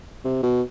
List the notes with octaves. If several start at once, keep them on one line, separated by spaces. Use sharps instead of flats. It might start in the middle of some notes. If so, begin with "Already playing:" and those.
C3
B2